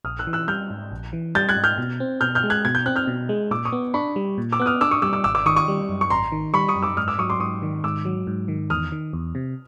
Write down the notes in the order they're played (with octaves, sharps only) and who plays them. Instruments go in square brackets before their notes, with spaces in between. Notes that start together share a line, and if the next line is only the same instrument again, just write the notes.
[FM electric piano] A#1 [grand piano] D#6 F6
[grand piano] E6 F#6
[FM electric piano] E3
[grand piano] E6 F#6
[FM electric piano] G3 [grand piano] F6 G6
[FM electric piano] G#2
A#1
E3
[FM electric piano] G3 [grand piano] G6 A6
[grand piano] F#6 G#6
[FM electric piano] G#2
[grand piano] F6 G6
[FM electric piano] B2
C4
[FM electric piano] B2 [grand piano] F6 G6
[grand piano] F6 G6
[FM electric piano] G#3
[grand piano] F#6 G#6
[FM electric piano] B2 [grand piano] G#6
[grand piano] G6
[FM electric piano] C4 [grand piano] F#6
[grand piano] F6 G6
[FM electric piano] B2
G#3
[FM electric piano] A#2 [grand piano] D6 E6
[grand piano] C#6 D#6
[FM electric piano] B3
[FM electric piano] D4 [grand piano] B5 C#6
[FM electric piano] G3
A#2
[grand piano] D6 E6
[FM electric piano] B3 [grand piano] F#6
[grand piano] D#6 F6
[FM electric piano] D4 [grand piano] D6 E6
[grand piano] C#6 D#6
[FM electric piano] G3 [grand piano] D6 E6
[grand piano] D6 E6
[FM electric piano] G#1 [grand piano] D6 E6
[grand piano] D6 E6
[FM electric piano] D#3 [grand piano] C#6 D#6
[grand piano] C#6 D#6
[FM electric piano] G3
F#2
[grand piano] C#6
[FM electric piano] G#1 [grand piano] A#5 C6
[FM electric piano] D#3
[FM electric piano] G3 [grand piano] B5 C#6
[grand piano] C#6 D#6
[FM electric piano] F#2
[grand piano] D6 E6
[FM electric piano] G#2 [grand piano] D#6 F6
[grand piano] D6 E6
[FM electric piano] F#3 [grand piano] C#6 D#6
[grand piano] C6 D6
[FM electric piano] G#2 [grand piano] C#6 D#6
[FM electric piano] D#3
[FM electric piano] G#2 [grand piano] D6 E6
[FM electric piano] F#3
G#2
D#3
[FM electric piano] E2 [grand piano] D#6 F6
[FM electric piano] D#3
E2
C3